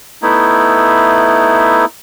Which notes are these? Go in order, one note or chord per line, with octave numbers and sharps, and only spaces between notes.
A3 B3 D#4 E4